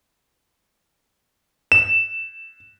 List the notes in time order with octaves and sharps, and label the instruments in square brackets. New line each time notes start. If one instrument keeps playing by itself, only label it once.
[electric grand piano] E7